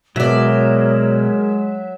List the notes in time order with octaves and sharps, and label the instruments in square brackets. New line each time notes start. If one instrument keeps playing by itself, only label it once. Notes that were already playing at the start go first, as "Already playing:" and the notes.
[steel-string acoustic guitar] B2 D5 [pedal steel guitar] F#3 E5 [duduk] G#3 [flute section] G#4 A#4 C#5